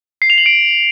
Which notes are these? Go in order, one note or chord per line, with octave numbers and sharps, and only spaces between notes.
C7
F7
F#7
D7